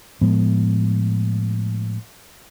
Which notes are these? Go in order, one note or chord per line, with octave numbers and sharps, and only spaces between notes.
A2 F3 G#3 B3